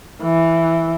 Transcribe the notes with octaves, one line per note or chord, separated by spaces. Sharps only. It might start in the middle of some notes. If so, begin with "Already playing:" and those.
E3